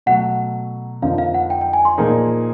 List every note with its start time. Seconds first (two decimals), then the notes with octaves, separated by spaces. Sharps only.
0.06 B2 F#3 A3 F#5
1.02 F2 D3 F3 A#3 D#4 F5
1.18 F5
1.34 F#5
1.50 G5
1.61 G5
1.73 G#5
1.85 C6
1.98 A#2 F3 A#3 D#4 G#4